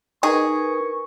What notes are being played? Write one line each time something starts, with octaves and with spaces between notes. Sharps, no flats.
D#4 G#4 A#4 B4 C#6